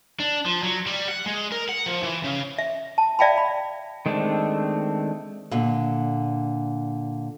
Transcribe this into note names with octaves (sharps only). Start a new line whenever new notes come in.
D4
F3
F#3
G3
F#5
G#3
A#4
F#5
F3
E3
C#3
E5
A5
D5 E5 F5 G5 A5 B5
B5
D#3 G#3 A3 C4 D4
A#2 D3